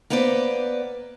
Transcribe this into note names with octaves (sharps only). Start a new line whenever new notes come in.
A#3 B3 B4 C5 D5